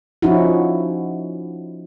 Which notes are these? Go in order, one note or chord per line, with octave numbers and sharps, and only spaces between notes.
F3 C#4 D#4 E4 F#4